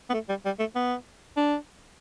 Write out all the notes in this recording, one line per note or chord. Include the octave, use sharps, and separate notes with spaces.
B3
A3
G3
G3
A3
B3
D4